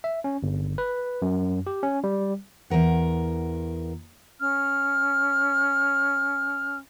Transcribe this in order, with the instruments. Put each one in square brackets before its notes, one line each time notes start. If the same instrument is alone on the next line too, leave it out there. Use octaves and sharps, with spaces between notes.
[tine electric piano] E5
C#4
G1
B4
F#2
G4
C#4
G3
[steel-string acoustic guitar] E2 G2 A#4 F#5
[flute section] C#4 F6